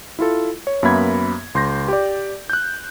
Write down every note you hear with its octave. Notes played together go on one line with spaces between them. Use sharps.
E4 F4 A4
C#5
F#2 A#3 B3 E5 B5 G#6
C#2 C6 G6 A#6
G4 D5
F#6 G6